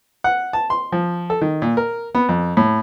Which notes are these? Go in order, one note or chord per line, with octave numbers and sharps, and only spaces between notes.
F#5
A5
C6
F3
A4
D#3
A#2
A#4
B3
F2
A2